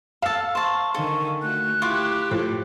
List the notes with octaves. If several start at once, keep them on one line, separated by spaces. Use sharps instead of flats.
A4 F5 A5 E6
C5 A5 C#6
D3 D#3 A4 G#5 C#6
A3 F#4 F#6
E4 F4 G4 C#6 D6
A2 F3